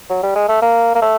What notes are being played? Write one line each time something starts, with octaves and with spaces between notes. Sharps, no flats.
F#3
G3
G#3
A3
A#3
A#3
A3